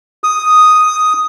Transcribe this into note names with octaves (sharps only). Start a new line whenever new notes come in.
D#6